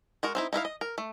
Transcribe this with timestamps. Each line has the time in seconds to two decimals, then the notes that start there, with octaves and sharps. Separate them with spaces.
0.23 G#3 F#4 A#4
0.35 C4 D#4 E4
0.53 D#4 E4 A#4 F5
0.65 D#5
0.81 A#4
0.98 A3